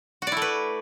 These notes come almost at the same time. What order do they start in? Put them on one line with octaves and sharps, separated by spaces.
F#4 D5 E4 A3 B4